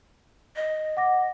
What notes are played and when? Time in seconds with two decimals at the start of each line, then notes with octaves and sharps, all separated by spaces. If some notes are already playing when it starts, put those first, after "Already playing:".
0.56 D#5
0.97 F#5 D6 A#6